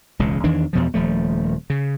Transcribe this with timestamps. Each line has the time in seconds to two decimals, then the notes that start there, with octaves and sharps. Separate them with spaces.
0.19 E1 C#2 C#3
0.44 E2 D#3 E3 D4
0.73 E2 B2 F3
0.94 D#1 F3 A3
1.70 C#3